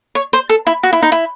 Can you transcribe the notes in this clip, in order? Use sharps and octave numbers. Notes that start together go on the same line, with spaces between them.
C#5
C5
A4
E4
F#4
E4
D#4
E4